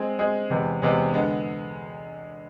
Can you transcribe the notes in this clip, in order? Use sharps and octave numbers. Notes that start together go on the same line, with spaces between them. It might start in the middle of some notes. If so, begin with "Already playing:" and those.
Already playing: G#3 C4 G#4
G#3 C4 G#4
E2 C3 G#3 B3
E2 C3 G#3 B3
D3 G#3 B3